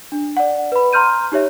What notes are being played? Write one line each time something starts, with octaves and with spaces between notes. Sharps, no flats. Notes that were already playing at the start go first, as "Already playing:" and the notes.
D4
D5 F#5
B4 B5
A#5 C6 F6 G6 D#7
D#4 G4 C#5 E5